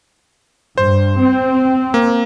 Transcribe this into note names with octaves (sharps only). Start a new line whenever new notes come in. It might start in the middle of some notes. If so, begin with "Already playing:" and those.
G2 C5
C4
A#3